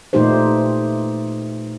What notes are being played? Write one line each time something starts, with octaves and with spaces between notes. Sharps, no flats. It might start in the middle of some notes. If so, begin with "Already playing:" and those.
A#2 E3 A3 D#4 G4 C5